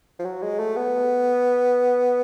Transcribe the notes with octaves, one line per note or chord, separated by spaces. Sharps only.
F3
F#3
G#3
A3
B3